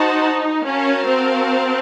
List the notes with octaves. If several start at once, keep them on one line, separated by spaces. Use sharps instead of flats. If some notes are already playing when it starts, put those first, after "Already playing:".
Already playing: D#4 F#4 C5 F#5 A5
C#4 F#4 A#4 F5 A5
C4